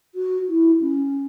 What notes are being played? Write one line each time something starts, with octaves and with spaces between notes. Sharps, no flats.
F#4
E4
C#4